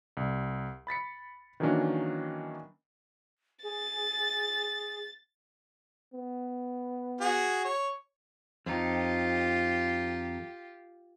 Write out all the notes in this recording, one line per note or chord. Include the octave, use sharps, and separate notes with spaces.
C2
B5 A6 B6 C#7
D#3 E3 F#3 A#3 C#4 D4
G#4 A6
B3
F#4 G#4
C#5
F2 D#4 F4 G4